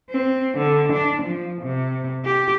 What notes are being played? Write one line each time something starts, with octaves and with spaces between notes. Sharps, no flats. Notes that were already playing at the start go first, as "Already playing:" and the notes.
C4
D3
D4
F3
C3
G4